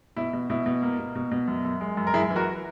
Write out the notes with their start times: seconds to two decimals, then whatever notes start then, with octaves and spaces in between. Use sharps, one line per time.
0.16 B2 E4
0.33 B2
0.50 B2 E4
0.66 B2
0.83 A#3
0.99 B2
1.15 B2
1.31 B2
1.48 F#2
1.65 F#2
1.81 G#3
1.97 F#2
2.07 A#4
2.14 F#2 E4 G#4
2.30 E3
2.36 F#4 A#4